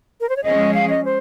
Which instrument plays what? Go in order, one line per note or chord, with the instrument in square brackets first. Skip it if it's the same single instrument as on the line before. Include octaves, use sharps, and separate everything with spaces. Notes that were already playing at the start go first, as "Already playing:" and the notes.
[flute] A#4
C5
C#5
[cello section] F3 G#3 C#4 G#4 [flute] D#5
[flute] F5
D#5
C5